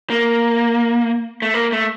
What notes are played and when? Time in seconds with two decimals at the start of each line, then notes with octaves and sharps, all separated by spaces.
0.10 A#3
1.42 A3
1.54 A#3
1.72 A3